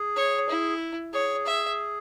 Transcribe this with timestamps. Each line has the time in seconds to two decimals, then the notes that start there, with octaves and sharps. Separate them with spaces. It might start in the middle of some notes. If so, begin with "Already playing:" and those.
Already playing: G#4
0.16 C#5
0.49 E4
1.13 G#4 C#5
1.46 E5